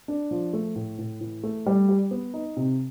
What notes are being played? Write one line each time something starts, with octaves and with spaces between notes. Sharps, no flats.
D4
F3
A3
A2
A2
E3
A3
G3
G4
B3
D#4
C3